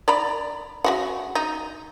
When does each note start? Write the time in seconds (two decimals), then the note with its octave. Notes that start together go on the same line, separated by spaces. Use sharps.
0.08 D5 A#5 B5
0.84 C#3 F#4 F#5
1.35 D#4